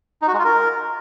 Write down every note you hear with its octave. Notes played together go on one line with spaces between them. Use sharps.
D#4
F#4
G#3
F4
A#4